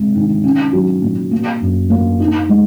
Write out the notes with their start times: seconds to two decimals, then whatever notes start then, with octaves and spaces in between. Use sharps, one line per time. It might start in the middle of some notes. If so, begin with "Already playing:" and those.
Already playing: C3 G#3
0.15 D#3
0.44 C#4
0.73 F#3
1.02 A#2
1.31 A#3
1.61 F#2
1.90 A#3
2.20 D#4
2.49 G#3